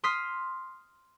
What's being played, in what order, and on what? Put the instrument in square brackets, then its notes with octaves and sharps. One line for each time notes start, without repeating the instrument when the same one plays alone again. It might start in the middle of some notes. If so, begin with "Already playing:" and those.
[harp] C6 D#6 F6 B6